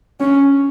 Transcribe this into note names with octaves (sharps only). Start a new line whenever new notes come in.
C#4